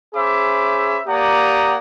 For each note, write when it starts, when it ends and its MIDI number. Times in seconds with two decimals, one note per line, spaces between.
0.15 1.00 61
0.15 1.00 68
0.15 1.00 72
0.15 1.00 76
0.15 1.00 83
0.15 1.00 86
1.07 1.78 58
1.07 1.78 67
1.07 1.78 74
1.07 1.78 78
1.07 1.78 82
1.07 1.78 87